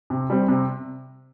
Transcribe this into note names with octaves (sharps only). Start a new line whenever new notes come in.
C3
G3 C4
C3